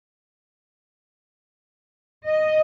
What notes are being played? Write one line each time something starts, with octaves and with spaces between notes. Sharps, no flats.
D#5